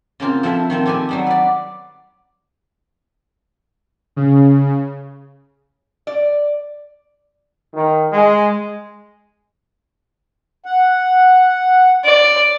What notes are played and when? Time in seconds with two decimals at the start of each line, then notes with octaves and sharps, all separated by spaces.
0.20 C#3 A#3 C4 F4
0.43 F3 C4 E4 A4 B4 E5
0.70 D#3 F3 C4
0.86 C4 G4 A4 B4 G#5
1.09 F#3 G3 B3
1.26 B4 D5
4.16 C#3
6.07 D5
7.74 D#3
8.13 G#3
10.66 F#5
12.05 D5